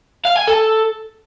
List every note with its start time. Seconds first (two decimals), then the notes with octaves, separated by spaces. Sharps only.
0.25 F5
0.36 G#5
0.47 A4